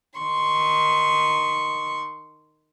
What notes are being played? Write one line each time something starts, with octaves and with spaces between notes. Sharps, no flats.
D#3 C6 C#6